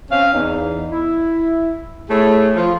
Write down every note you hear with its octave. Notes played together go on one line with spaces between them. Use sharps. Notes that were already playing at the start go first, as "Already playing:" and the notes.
C4 C#4 F5
E2 D#4
E4
A3 E4 G#4 C#5
F3 F4